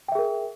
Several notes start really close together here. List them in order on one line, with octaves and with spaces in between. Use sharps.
G5 E5 G#4 A#4